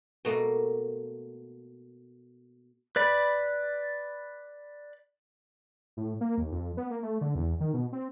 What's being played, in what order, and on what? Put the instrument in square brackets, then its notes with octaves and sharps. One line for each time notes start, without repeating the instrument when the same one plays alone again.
[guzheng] B2 A3 A#3
[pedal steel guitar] B4 D5 B5
[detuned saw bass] A2
A#3
D#2
F2
B3
A#3
A3
D3
E2
D#3
B2
C4